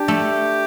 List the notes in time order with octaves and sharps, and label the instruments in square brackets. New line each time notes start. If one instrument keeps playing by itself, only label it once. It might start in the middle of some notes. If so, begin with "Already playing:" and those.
Already playing: [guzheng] D4 [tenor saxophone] G4
[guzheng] A3